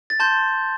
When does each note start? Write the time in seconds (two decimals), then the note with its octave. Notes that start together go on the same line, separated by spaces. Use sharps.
0.10 A6
0.20 A5 C6 G6